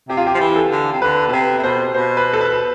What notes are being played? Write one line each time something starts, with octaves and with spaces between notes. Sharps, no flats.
C3 G4
F4
G4
F3
E3
A4
D3
C3
D3 B4
B2
C3 B4
C3
B2 C5
B2 C5
B4
A4
B4